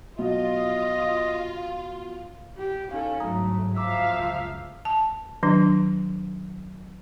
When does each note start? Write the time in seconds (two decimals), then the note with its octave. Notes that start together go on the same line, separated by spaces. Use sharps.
0.18 B2 F#3 F4 D#5
2.58 G4
2.91 C#4 D#4 A4 F5
3.20 G1 G#2 F#3 A3 A#5 D#6
3.76 F3 E5 F5 A#5 D6 E6
4.08 C#2 F#2
4.85 A5
5.43 D#3 F#3 D4